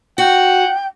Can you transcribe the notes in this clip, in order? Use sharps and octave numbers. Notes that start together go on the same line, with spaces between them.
F#4 F#5 G5